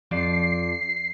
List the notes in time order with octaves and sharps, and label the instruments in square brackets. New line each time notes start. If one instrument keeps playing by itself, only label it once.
[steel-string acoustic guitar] F2 F3 D5 [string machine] C7